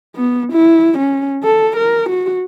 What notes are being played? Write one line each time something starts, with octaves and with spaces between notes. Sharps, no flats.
B3
E4
C#4
A4
A#4
F#4